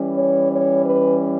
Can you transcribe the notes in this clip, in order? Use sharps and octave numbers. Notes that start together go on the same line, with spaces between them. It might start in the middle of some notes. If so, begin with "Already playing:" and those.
Already playing: E3 G3 C#4
C#5
C#5
B4